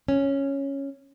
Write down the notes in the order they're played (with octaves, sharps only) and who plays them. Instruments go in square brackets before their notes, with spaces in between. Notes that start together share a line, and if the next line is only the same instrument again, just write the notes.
[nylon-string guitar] C#4